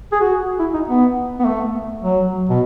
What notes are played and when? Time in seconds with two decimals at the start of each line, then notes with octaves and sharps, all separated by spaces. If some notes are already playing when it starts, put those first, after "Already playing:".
0.12 G#4
0.21 F#4
0.59 E4
0.74 D#4
0.88 B3
1.40 B3
1.45 A3
2.02 F#3
2.49 B2